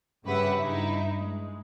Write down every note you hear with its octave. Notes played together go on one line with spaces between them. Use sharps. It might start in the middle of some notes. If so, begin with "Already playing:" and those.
G2 C#3 G4 B4 E5 F#5
G2 D#4 E4
G#3